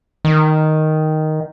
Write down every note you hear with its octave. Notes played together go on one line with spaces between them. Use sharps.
D#3